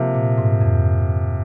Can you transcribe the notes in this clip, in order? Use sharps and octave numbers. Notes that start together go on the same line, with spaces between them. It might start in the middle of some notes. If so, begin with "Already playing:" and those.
Already playing: C3 F3 A#3
A#2
G#2
F2